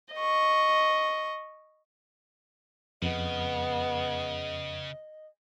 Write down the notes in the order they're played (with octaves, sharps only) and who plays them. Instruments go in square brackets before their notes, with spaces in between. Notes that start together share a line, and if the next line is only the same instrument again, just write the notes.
[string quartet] D#5 C#6
[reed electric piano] F2 [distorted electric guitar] C#3 [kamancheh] B3 [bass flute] D#5